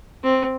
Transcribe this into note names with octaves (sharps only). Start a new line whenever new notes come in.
C4